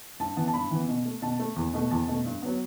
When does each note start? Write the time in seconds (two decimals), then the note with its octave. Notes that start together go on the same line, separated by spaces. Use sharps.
0.20 G2 A5
0.37 E3 B3 A5
0.48 A5
0.53 G2 B5
0.71 E3 B3
0.89 B2
1.05 A3
1.22 B2 A5
1.40 A3
1.56 E2
1.74 B2 A3
1.91 E2 A5
2.08 B2 A3
2.25 G2
2.42 F#3 B3